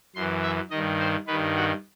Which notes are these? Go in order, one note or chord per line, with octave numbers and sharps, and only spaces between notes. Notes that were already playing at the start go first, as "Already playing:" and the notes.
F#2 E3 C6
E5
G2 D#3 D#5
C5
G2 D#3 B4
F#4